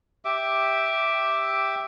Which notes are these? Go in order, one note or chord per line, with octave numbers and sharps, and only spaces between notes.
G4 E5 D6